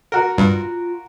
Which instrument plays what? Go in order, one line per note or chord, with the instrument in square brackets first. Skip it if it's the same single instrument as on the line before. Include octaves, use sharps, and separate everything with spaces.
[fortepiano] F#4 A#4
[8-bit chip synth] G2 [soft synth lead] F4